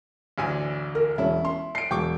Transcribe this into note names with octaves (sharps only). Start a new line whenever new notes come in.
A1 D2 G#5
A#4
E1 C#4 E4
C6
C7 D7
E1 G5 C#6 D6